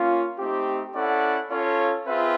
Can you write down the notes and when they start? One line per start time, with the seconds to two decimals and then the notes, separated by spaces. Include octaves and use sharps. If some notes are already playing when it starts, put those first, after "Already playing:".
Already playing: A#3 C#4 F4
0.38 A3 C4 D#4 G4
0.94 C#4 E4 A4 D5 F#5
1.50 C#4 F4 A4 C#5 F5
2.06 C4 F4 G#4 B4 E5